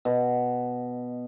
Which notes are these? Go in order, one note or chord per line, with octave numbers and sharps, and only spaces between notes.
B2